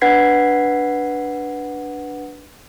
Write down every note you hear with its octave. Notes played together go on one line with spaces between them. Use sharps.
D4 B4 F#5 G#6 B6 C7